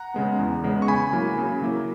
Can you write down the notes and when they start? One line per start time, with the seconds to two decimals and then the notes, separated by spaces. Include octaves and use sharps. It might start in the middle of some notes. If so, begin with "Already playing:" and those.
Already playing: F#5 A#5
0.14 C#3 G#3 B3
0.39 E2
0.64 C#3 G#3 B3
0.82 C#6
0.88 C#3 G#5 B5
1.13 F#3 A#3 E4
1.38 C#3
1.62 F#3 A#3 E4